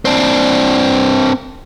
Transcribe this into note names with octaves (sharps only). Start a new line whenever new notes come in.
C4 D4